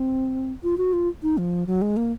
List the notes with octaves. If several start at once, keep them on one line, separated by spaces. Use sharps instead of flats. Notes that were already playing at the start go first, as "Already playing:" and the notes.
Already playing: C4
F4
F#4
F4
D#4
F3
F#3
G#3
A#3